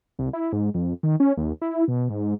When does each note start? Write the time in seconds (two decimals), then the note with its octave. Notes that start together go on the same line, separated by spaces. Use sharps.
0.19 C2
0.33 E4
0.52 G#2
0.74 F2
1.03 D#3
1.20 C#4
1.37 D#2
1.62 E4
1.88 B2
2.10 G#2